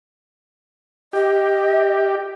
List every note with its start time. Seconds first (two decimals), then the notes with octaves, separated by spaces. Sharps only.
1.13 G4 D#5